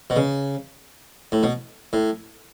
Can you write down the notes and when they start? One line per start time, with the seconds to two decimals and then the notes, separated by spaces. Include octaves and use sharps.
0.10 B2
0.16 C#3
1.32 A2
1.43 B2
1.93 A2